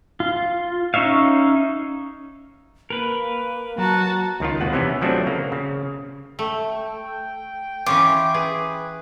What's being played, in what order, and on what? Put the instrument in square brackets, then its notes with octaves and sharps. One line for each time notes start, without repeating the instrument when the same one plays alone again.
[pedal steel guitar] F4
C#4 D#4 C#5 E5 F5
[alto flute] A#3 [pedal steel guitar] A#4 B4
[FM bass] F#3 [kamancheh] F#4 A5 [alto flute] A#5
[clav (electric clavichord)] C#2 D#3 F4
D#2 B2 F#5
C3 E3 B3 C#4
F3 F#3 A3 C4 D4
C#3 A#3
C#3
[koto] A3 [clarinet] G5
[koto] E3 C#4 F4 [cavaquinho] D6
[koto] G#4 [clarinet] B4